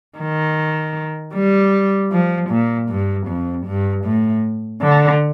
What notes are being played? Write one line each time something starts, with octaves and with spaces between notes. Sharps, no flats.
D#3
G3
F3
A#2
G2
F2
G2
A2
D3